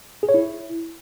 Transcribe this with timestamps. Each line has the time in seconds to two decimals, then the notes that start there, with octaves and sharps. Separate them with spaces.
0.23 G#4
0.29 C#5
0.34 E4